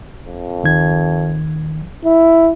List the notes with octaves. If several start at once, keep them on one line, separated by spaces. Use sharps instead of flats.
F2
D#2 D#3 G#6
E4